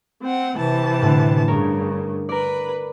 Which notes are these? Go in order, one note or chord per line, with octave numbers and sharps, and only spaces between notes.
C4 F#5
C3 E3 A5
A2 D3
G2 C#3 A#4 C#5
A#4 B4 D5